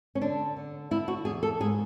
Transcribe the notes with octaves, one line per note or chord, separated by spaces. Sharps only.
C#4
D3 D4
D3
D3 E4
F#4
E2 G#4
A4
G#2 G#4